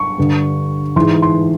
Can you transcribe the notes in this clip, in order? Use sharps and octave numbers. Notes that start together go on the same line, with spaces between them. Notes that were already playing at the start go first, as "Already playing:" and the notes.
Already playing: C#6
G2 D3
G#2 E3 C6
C6